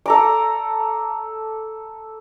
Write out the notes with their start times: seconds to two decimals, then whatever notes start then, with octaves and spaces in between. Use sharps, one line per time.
0.06 A4 A#5 D6